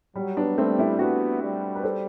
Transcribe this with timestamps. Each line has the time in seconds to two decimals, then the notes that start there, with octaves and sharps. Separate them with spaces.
0.15 F#3 G3
0.36 B3 D4
0.58 G3 A3 C4
0.79 C4 E4
0.94 G4
0.99 B3 D4 F#4
1.42 G3
1.75 B4
1.83 A4 C5